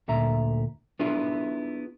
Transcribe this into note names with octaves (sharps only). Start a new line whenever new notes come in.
D2 A#2 E5 A#5
B3 D4 E4 F4 G#4